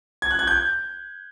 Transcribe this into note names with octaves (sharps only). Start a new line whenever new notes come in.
G#6
F#6
G#6
G6